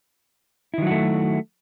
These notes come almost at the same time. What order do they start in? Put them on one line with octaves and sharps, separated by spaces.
E4 D#3 F#3 F#4 A3